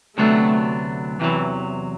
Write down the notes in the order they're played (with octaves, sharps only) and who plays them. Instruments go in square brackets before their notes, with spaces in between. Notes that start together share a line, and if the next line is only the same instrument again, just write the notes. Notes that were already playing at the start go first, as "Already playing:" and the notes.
[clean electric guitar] D2 C3 F#3 B3 D4 [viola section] A3
[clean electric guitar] E2 C3 F#3 [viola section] E3